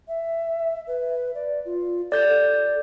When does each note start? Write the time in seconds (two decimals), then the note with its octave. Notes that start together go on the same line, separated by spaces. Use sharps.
0.08 E5
0.87 B4
1.35 D5
1.65 F4
2.12 A4 D5 G6 A6
2.28 A4